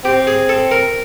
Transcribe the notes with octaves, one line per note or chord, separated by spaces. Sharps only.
C4 G4
G#4
A4
A#4